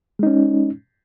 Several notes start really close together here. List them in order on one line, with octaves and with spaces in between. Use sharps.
G#3 D#4 C#4